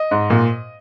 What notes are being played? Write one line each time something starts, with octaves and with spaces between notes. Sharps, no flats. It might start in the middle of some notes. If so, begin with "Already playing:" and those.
Already playing: D#5
G#2
A#2